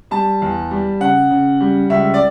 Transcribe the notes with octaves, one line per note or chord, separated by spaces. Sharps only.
G3 A5
E2
G3
C#3 F#5
C#3
G3
C#2 E5
D5